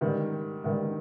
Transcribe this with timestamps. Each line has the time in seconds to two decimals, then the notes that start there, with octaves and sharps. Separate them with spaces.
0.01 G#2 D#3 G3
0.64 G#2 D#3 G3